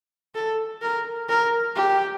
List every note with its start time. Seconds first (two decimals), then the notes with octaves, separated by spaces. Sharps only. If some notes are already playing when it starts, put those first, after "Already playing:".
0.35 A4
0.82 A#4
1.29 A#4
1.76 G4